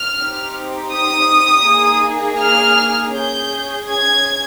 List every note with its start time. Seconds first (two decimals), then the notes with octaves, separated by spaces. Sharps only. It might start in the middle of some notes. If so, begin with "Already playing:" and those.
Already playing: F6
0.17 C4 D#4 G4
0.92 D#6
1.67 A#3 D#4 G#4
2.41 F6
3.16 C#4 G#4 G6
3.91 G#6